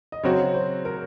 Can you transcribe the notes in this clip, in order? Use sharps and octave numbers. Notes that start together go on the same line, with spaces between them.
D#5
C#3 F#3 C4 F#4 C#5
C5
A#4